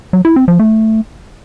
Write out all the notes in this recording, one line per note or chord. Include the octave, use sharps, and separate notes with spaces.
F#3
E4
C4
F3
A3